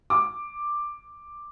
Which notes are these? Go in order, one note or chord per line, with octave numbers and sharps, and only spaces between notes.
D6